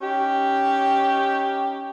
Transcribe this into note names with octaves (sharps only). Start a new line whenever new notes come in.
C#4 D#4 G4